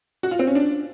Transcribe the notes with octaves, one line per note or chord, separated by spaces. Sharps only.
F#4
F4
C4
C#4
D4